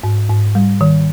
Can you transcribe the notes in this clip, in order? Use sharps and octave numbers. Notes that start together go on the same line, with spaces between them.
G#2
G#2
G3
D#3